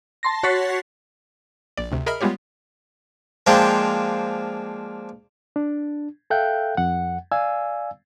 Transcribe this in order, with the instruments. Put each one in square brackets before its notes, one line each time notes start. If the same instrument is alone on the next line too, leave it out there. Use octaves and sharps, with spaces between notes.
[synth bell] A5 C6 A#6
F#4 C#5 F#5 A6 B6 C7
[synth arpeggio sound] A#1 D5
D2 C3
G#4 A#4 D#5 E5 B5 F6
G3 G#3 B3 F4 G4 C#5
[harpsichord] F3 G#3 A#3 C4 D4 F4
[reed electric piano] D4
A4 E5 F5 G5 F#6 G6
F2 F#5
D5 F5 G#5 E6